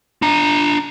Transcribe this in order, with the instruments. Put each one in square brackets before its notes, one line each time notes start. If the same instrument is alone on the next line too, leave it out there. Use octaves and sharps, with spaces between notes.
[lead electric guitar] D4 A#5